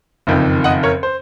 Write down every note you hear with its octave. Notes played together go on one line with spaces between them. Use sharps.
F#1 F2 D#3
D#5 F#5
A#4 C#5
C5